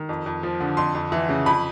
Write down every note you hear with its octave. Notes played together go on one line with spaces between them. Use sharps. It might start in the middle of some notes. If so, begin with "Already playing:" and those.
Already playing: D#3
F2
F2
F3
D3
F2 C6
F2
E3
C#3
F2 B5